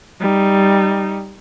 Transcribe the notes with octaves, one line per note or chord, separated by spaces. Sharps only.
G3 D#4